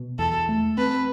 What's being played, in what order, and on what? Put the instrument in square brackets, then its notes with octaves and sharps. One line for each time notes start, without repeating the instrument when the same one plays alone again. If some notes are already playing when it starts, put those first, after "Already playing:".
Already playing: [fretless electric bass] B2
[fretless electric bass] E2 [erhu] A4
[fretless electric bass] A3
[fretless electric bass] C4 [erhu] B4